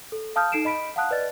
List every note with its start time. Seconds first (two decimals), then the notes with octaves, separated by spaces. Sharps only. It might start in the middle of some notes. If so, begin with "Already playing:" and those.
0.12 A4
0.36 F5 A5 D#6 F6 G6
0.52 D#4 A4 C7 D7 E7
0.65 D#5 B5 B6 D7
0.96 F5 F#5 A5 D#6 F#6
1.11 B4 D5 D#5 A6